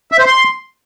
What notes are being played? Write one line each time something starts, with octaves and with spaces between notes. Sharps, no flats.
E5
C5
C6